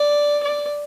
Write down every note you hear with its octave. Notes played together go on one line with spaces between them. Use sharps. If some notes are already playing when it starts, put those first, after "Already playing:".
Already playing: D5
D5